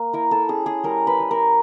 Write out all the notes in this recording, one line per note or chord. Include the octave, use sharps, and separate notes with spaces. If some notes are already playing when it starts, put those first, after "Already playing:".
Already playing: A#3
E4 A#4
A4
C#4 G#4
G#4
G3 A#4
B4
G3
A#4